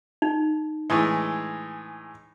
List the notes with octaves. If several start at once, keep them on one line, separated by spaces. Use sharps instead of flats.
D#4
A2 E3 G#3